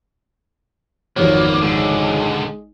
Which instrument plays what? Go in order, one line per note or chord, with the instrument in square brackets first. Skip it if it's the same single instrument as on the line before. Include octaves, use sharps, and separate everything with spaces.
[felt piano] G#1 F2 C#5 [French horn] F#3 [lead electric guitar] A#3 B3
[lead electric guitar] C#2 D3 [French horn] G#3